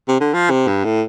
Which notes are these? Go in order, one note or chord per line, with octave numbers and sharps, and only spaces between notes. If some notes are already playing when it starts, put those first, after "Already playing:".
C3
D3
F3
C3
G2
A2